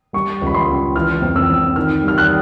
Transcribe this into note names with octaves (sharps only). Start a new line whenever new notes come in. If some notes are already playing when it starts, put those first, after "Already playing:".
G3 C#6
C#2
B5
C6
C#2
E3 F6
F2
E6
F2
D#3 F6
G3
F6
F#6